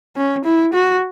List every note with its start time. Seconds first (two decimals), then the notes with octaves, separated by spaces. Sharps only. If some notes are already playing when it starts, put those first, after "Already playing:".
0.16 C#4
0.45 E4
0.74 F#4